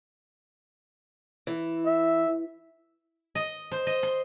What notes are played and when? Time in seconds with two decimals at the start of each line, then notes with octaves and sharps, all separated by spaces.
1.47 E3
1.86 E5
3.35 D#5
3.72 C5
3.87 D#5
4.03 C6